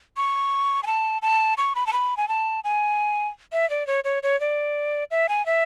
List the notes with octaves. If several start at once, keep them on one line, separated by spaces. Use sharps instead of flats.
C#6
G#5
A5
A5
C#6
B5
A5
B5
G#5
A5
G#5
E5
D5
C#5
C#5
C#5
D5
E5
G#5
E5